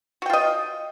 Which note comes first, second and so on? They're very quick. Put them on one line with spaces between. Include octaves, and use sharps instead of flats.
F#4 G5 F4 D#5